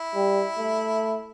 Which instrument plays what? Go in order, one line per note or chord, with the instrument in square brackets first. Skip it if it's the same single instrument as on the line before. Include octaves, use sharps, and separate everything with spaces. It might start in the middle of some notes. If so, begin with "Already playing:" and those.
Already playing: [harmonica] E4
[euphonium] G3
A3